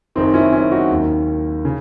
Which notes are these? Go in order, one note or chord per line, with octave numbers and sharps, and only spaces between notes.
F#1 F#2 D#3 C4 D#4
C#4 E4
C#4 E4
D#4 F#4
D#2 D#3
C#3